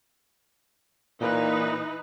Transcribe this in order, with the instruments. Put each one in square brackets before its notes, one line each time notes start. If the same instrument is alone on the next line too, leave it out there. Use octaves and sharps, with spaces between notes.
[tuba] A#2 [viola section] E3 D#4 B4